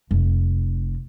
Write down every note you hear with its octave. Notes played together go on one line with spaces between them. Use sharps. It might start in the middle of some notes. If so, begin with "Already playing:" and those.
F1